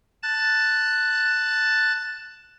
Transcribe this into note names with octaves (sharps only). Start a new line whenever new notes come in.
A5 F#6 A6